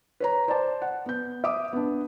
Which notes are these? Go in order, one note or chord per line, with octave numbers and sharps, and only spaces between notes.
B4 C#5 A#5
C5 D5 A5
F#5
B3 G6
E5 D6 D#6
B3 D4